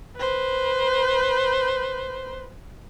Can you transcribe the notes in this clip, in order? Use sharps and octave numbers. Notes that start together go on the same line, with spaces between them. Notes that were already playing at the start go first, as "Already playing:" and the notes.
B4 C5